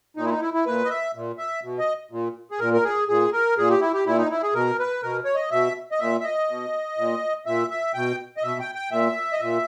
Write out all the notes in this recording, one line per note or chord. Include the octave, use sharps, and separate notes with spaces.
A#2 D#4
E4
D#4
E4
E4
A#2 B4
D#5
E5
A#2
E5
B2
D#5
A#2
G#4
A#2 A#4
A#4
G#4
A#2 G#4
A#4
A#2 G#4
G4
E4
G4
A#2 E4
D#4
E4
G#4
B2 A#4
B4
B2 A#4
C#5
D#5
B2 E5
D#5
A#2 E5
E5
D#5
B2
A#2
A#2 E5
E5
B2 G5
D#5
B2 E5
G5
G5
A#2 E5
D#5
A#2 E5